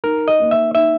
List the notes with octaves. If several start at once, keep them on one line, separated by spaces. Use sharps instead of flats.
D#3 A#4
D#5
A#3 D#4
E5
D#3 E5